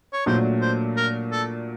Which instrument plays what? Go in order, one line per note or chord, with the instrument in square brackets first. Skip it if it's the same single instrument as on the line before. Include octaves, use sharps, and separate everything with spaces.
[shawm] C#5
[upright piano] A#2 F#3 A3 D4 [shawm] C5
[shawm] C5
A#4
A4